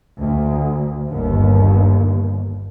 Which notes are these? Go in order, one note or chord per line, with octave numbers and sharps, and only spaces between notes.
D2
G1 D#2